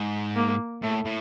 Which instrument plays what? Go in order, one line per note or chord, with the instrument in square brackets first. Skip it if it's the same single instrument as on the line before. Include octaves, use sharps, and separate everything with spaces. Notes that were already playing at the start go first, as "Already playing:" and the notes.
Already playing: [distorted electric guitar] G#2
[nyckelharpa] A#3
[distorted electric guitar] A2 [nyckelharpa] A3
[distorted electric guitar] A2